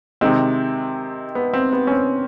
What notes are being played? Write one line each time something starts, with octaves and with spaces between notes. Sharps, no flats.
C3 D#3 G#3 C4
B3
C4
B3
C#4
C4